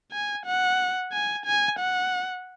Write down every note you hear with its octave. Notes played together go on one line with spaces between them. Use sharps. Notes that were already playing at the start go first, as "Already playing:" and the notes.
G#5
F#5
G#5
G#5
F#5